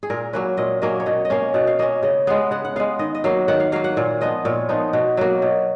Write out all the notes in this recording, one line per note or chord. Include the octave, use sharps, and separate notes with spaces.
G#4
A#2 A#4
F#3 A#3 C#4 B4
A#2 D#5
F#3 A#3 C#4 D#5
C#5
B2 D#5
D#5
A#3 C#4 F5
B2 F#5
F5
A#3 C#4 D#5
C#3 D#5
G#3 B3 F5
C#3 F#5
F#5
G#3 B3 F5
D#3 D#5
D#5
F#3 A#3 F5
D#3 F#5
F5
F#3 A#3 F5
F#5
A#2 F5
F3 B3 D#5
A#2 C#5
F3 B3 D#4
B2 F#4
F#3 A#3 F#4
B2